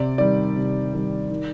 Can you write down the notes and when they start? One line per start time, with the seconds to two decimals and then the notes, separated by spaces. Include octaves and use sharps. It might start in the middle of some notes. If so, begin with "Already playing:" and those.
Already playing: C3 D5
0.18 D#3 G3 D5
0.55 C3
0.93 D#3 G3
1.30 D#3